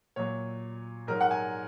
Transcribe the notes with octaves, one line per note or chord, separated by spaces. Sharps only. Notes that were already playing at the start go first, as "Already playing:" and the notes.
A#2 F#3 C#5
G#2 F#3 A#4
F#5
G#5